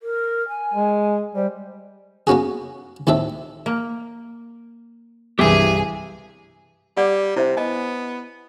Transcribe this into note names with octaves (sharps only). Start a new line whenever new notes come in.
A#4
G#5
G#3
G3 C5
A#3 B3 C#4 F#4 G#4
D#2 A2 C4 A4 E5
A#3
C2 G2 E3 G4 G#4 E5 G5 G#5
G3 D5 F#5 D6
C3 E4 C5 E5
B3 D#5 G#5